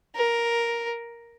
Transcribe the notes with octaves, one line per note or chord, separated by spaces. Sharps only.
A#4